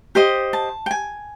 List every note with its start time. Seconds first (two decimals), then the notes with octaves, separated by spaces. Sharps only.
0.15 G4 C5 D#5
0.53 A5
0.86 G5
0.91 G#5